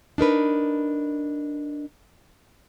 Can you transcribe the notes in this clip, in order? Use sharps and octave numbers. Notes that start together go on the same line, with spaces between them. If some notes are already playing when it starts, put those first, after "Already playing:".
D4 D#4 A#4 B4